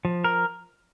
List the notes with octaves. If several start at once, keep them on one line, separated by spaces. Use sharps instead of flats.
F3
A#4